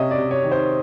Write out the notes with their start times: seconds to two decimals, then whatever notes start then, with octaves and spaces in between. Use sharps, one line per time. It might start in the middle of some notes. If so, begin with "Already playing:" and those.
Already playing: C3 C#4 D#5 E5
0.11 D5
0.18 C3
0.31 C#5
0.44 D#3
0.51 C5